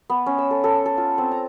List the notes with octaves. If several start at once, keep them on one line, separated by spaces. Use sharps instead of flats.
B3
C#4
E6
A4
A4
A4
F4
C4
A#5